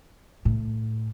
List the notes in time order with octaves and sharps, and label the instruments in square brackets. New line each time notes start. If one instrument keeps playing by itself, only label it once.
[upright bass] A2